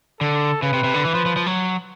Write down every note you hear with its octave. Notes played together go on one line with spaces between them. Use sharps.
D3 A4
C#3 B4
C3
C3
D3
E3
F3
F3
F3
F#3